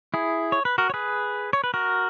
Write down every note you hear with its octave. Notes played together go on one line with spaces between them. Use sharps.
E4 G#4
C#5
B4
F#4 A#4
C#5
G#4 B4
C#5
B4
F#4 A#4